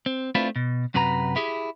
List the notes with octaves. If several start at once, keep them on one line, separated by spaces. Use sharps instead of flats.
C4
A3 C4 D4 E4 F4 B4
B2
F#2 C3 F#4 B4 A#5
E4 G4 G#4